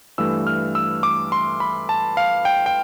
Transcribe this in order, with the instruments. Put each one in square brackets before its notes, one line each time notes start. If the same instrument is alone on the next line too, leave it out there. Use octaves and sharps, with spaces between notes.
[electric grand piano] G2 E3 A3 E6
F6
E6
D6
C6
B5
A5
F5
G5
G5